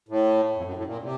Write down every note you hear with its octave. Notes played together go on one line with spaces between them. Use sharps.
A2
F2
F#2
A2
A#2
C3